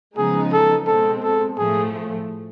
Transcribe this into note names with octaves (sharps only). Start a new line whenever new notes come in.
C#3 F3 G#3 B3 D#4 G#4
A4
B2 G#3 C4 A4
A4
A2 F3 A3 G#4